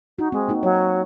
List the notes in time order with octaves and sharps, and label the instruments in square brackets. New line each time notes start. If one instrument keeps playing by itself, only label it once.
[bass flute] D#4 [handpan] F#4
[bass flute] G#3 [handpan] C4
[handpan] A#3 D#4 F#4
[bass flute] F#3 [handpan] C#5